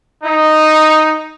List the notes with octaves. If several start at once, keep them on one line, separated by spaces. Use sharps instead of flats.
D#4